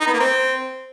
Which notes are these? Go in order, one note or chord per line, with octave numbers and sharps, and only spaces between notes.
D#4
B3
A#3
C4